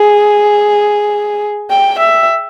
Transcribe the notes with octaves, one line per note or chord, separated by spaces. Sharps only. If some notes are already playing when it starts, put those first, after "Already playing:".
Already playing: G#4
G5
E5